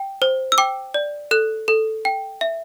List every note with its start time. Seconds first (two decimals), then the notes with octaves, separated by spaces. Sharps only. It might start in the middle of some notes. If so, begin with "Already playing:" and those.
Already playing: G5
0.22 C5
0.52 E6
0.58 G5 D6
0.94 D5
1.31 A4 F#6
1.68 A4
2.05 G5
2.41 E5